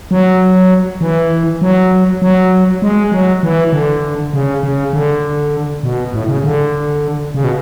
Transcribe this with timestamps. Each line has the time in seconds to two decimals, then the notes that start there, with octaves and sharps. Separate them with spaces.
0.11 F#3
1.01 E3
1.62 F#3
2.22 F#3
2.82 G#3
3.12 F#3
3.43 E3
3.72 D3
4.33 C#3
4.63 C#3
4.93 D3
5.83 B2
6.13 A2
6.28 C#3
6.44 D3
7.34 C#3
7.44 B2